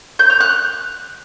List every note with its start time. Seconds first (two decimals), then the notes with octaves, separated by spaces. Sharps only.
0.19 G6
0.30 F6
0.40 F#6